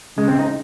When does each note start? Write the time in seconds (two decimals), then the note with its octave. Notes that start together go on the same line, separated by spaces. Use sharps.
0.17 C#3 G#3
0.28 C4
0.39 D#4